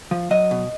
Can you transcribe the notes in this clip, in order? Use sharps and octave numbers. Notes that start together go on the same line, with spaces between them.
F3
F#3 D#5
B2